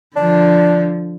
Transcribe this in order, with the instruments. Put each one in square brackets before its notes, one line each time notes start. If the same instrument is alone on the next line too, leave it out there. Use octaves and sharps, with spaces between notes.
[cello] D3 F3 [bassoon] D4